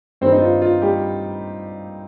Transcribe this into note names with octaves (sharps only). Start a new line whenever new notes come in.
G2 D#3 C4 C5
D#4
F4
F4
G3 G4